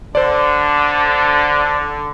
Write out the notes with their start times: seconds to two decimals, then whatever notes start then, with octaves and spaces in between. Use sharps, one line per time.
0.15 D3 C5 D5